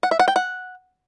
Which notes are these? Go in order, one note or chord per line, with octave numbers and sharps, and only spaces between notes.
F#5
E5
F#5
G5
F#5